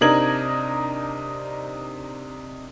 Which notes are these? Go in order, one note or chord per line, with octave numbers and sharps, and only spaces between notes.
C3 D4 D#4 A#4 G#6 F#7